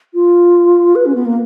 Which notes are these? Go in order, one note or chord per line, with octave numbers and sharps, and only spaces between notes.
F4
B4
C#4
B3
A#3